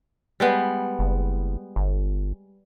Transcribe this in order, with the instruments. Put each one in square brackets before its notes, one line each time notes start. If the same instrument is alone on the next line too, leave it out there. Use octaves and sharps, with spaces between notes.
[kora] G3 G#3 B3
[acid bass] F#1
G1